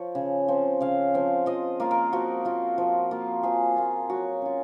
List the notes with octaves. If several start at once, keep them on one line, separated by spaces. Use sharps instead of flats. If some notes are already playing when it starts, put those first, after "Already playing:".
Already playing: F3 C#5
C#3
F3 C4
C#3 F5
F3 C4
F3 D#5
A#3 F4
A#4
F3 F#4
A#3 F4
F3
A#3 F4
F3 G#4
A#3 F4
F#3 F#4
C#4 F4